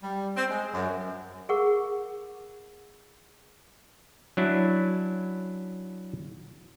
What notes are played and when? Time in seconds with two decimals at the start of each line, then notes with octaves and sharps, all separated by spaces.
0.03 G3
0.36 C4
0.50 G#3
0.74 F#2
1.49 G#4 A#4 F#5 C#6
4.37 F#3 C#4 D4 E4